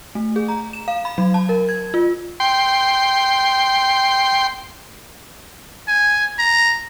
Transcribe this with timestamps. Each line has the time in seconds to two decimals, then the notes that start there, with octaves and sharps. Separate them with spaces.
0.15 A3
0.36 G#4
0.48 A#5
0.73 E7
0.88 F5
1.05 B5
1.18 F#3
1.34 A5
1.49 A#4
1.69 G#6
1.94 F4
2.40 G5 C6
5.88 G#5
6.39 A#5